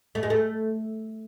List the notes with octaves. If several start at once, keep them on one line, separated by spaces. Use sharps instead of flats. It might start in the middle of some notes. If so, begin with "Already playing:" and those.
A3
G#3
A3